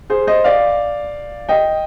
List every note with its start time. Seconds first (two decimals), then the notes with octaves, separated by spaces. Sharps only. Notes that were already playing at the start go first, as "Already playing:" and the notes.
0.10 G#4 C5
0.27 C5 D#5
0.44 D5 F5
1.49 D#5 G5